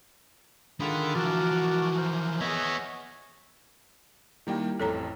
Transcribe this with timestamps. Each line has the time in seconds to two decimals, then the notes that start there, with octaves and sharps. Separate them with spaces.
0.80 D3 D#3 F4 G#4 B5
1.15 E3 F3 F#4 A#4 A5 D6
1.97 A#4 C5
2.40 B3 G#4 C#5 D#5 E5
4.47 D#3 G3 A#3 E4 G5
4.79 A1 F2 A4 C#5 A#5